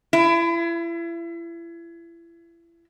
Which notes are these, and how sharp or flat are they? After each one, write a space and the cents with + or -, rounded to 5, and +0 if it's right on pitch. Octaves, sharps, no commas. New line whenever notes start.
E4 +35